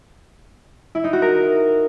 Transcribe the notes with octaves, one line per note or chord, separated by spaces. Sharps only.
E4
D#4
F#4
A#4